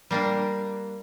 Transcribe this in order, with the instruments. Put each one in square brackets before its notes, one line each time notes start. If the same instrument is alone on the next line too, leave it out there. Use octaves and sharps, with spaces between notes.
[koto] G3 A#3 D4